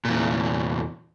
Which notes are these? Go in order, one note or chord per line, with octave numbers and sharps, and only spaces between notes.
E2 A#2